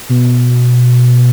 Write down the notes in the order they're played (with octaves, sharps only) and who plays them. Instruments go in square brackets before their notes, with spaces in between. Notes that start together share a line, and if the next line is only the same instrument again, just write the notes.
[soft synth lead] B2